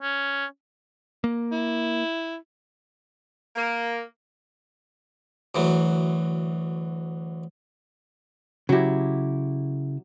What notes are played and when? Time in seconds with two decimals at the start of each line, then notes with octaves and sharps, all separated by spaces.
0.01 C#4
1.24 A#3
1.52 E4
3.56 A#3
5.55 D2 E3 F#3
8.69 C#3 F#3 E4 G4